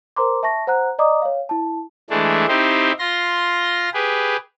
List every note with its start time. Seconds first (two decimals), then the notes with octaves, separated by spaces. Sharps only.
0.16 A#4 C5 A#5 C6 D6
0.43 E5 A5 C#6 A#6
0.67 C5 F#5 A#5 F#6
0.99 D5 D#5 A#5 D6 D#6
1.22 C#5 F5
1.49 E4 A5
2.10 E3 G#3 A3 D4
2.48 C4 D#4 E4 G4 C5
2.99 F4 C6 A#6
3.94 G4 G#4 B4